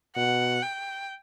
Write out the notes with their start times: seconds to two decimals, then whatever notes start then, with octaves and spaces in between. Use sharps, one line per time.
0.16 B2 F#5
0.62 G5